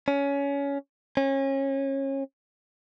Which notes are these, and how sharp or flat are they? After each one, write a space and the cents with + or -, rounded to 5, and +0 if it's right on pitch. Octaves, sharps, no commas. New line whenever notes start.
C#4 +20
C#4 -30